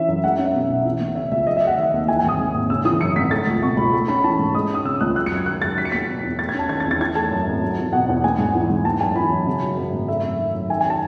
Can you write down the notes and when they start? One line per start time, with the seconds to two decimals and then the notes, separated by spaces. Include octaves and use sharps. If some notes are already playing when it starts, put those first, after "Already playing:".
Already playing: E3 C#4 E5
0.08 F#2
0.23 G#3 F#5
0.39 C#4
0.45 E5
0.54 B2
0.70 B1
0.85 E3
1.00 B3
1.15 C#3 E5
1.31 C#2 E5
1.47 F#3 D#5
1.57 E5
1.62 A3
1.67 F#5
1.77 D#3 E5
1.94 D#2
2.08 E3 G#5
2.19 G#5
2.24 G#1 D#6
2.39 G#2
2.54 G#1
2.70 C#3 E6
2.85 E3 D#6
3.00 F#2 C#7
3.16 G#1 B6
3.31 A3 A6
3.47 C#2
3.62 B2 C#6
3.77 C#2 B5
3.92 A3 C#6
4.08 C#4 B5
4.24 E3 A5
4.39 G#2
4.55 G#3 D#6
4.69 C#4 D#6
4.85 C#3 E6
5.01 C#2 F#6
5.15 F#3 F#6
5.26 C#7
5.32 F#2 G#6
5.46 D#3 F#6
5.62 F#2 A6
5.78 F#3 B6
5.85 C#7
5.92 B3 B6
6.08 B2
6.23 E2
6.39 A3 A6
6.49 G#6
6.54 C#4 A5
6.69 D#3 G#6
6.80 A6
6.85 E2
6.91 A6
7.00 E3 G#6
7.15 A3 A5
7.31 F#2
7.47 G#1
7.62 F#3
7.78 E2
7.93 B2 F#5
8.09 E2
8.24 B3 G#5
8.39 G#2
8.55 E3
8.70 G#2
8.85 B3 A5
9.01 F#2 G#5
9.16 E3 B5
9.32 F#2
9.47 C#3
9.63 F#3
9.77 F#2
9.93 G#1
10.08 A3 E5
10.23 F#2
10.39 D#3
10.55 F#2
10.69 D#3 G#5
10.81 G#5
10.90 A5